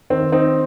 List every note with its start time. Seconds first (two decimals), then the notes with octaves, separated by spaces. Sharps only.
0.10 D#3 C4
0.32 C4 D#4